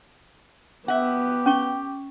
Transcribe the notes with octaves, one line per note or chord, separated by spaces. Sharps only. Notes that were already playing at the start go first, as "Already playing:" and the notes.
B3 G4 E5 F#5
C#4 C#6